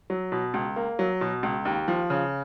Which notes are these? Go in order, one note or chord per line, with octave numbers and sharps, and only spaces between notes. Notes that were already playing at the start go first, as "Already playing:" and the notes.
F#3
B2
C#2
A#3
F#3
B2
C#2
D#2
F3
C#3